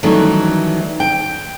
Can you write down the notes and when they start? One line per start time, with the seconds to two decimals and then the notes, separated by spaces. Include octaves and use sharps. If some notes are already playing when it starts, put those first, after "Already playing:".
0.03 D#3 E3 F#3 G3 A3 C#4
1.00 G5